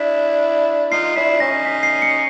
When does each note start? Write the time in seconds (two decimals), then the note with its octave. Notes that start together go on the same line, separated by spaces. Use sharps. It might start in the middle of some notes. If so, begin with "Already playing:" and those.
Already playing: D4 E4 B6
0.91 D#4 F4 C7
1.16 D4 E4 B6
1.40 C#4 D#4 A#6
1.65 B6
1.83 C7
2.02 C#7